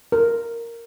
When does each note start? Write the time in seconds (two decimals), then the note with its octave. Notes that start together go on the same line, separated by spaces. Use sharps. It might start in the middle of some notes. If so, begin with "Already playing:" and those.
0.12 A#4